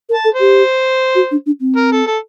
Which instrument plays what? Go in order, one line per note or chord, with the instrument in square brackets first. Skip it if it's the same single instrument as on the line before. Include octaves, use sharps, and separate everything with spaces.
[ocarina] A#4
[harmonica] A5
[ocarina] A4
[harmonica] C5
[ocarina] G4
F#4
D4
D4
C4
[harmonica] A#4
A4
A4